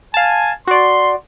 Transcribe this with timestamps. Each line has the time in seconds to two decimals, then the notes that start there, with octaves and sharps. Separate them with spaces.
0.14 F5 G#5 A5
0.67 F#4 D5 C6